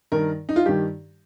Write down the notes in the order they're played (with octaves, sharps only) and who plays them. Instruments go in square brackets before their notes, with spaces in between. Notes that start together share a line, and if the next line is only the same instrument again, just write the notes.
[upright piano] G2 D#3 A#4
D#4
F4
G2 D#3 G4